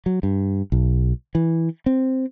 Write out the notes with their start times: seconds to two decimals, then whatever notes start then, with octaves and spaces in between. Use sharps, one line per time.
0.06 F#3
0.23 G2
0.72 B1
1.35 E3
1.86 C4